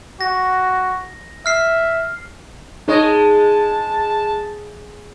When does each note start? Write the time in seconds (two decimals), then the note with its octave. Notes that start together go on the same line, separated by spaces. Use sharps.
0.21 F#4 A#6
1.46 E5 F6 C7
2.88 G#3 D#4 C#5 D#5 A5